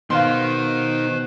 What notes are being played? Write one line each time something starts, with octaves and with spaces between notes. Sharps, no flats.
B2 D#3 B4 C5 F5 C6